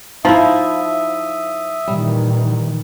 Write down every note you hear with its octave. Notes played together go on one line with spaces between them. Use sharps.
F3 D#4 E4 E5 D#6
A#2 D#3 E3 G3